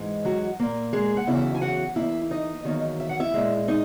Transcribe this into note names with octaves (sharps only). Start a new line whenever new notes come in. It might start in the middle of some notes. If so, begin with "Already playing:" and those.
Already playing: G#2 E3 G#3
F#3 F#4
A#2 A#3
G#3 G#4
F#5
E2 C#3 F#3 E4 E5
G#5
F#4 F#5
E2 D#3 A#3 E4 E5
D#4 D#5
E2 D#3 F#3 A#3
E5
F#5
E4 E5
A#2 G#3
D#4 D#5